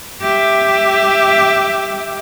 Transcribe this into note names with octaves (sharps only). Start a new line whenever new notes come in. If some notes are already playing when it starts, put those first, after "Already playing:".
G4 E5